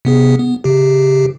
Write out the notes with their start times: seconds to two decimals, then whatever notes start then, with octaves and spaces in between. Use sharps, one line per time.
0.05 C3 B3 G#4
0.40 B3
0.64 C#3 G4